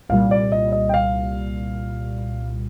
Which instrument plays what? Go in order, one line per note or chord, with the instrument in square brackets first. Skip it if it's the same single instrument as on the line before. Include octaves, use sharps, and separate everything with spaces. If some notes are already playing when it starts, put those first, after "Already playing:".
[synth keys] C2 A#2 G3 [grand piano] F5
[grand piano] D5
D#5
D#5
G5
F5